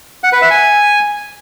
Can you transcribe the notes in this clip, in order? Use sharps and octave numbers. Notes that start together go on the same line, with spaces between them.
F#5
B4
E5
G#5